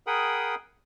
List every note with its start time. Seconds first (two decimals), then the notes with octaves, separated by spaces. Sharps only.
0.07 G#4 A#4 F#5 G5 B5 D#6